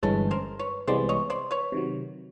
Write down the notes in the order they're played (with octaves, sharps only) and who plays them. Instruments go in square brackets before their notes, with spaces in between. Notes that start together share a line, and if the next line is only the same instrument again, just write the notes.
[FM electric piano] G1 G2 E3 G#3 C#4 [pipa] A4 B4
[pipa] A#4 C5
B4 C#5
[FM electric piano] C2 C3 E3 G#3 B3 [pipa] C5 D5
[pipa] C#5 D#5
C5 D5
B4 C#5
[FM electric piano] C3 D#3 F#3